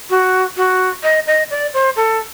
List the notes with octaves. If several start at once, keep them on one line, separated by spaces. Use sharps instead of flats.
F#4
F#4
D#5
D#5
D5
C5
A4